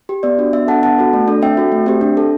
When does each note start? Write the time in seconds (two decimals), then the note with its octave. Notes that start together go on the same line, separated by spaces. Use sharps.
0.09 G4
0.23 B3 D5
0.39 D4 F#4
0.53 B3 E5
0.68 D4 A4 F#5 A5
0.83 B3 F#5 A5
0.98 F#4 A4
1.13 A3
1.28 D4 A4
1.42 C4 E5 G5
1.57 F#4 A4
1.72 A3
1.86 C4 G4
2.01 D4
2.17 A4